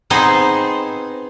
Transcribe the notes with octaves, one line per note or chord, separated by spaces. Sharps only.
B3 C4 D#4 G#4 C5